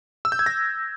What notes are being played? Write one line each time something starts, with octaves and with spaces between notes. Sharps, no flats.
E6
G6
G#6
A#6